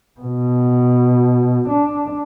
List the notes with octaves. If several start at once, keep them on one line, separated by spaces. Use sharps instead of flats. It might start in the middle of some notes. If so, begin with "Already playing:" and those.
B2
D4